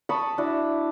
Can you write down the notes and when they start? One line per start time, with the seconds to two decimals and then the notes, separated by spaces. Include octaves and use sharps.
0.09 A5 B5 C#6 D#6
0.38 D4 E4 F#4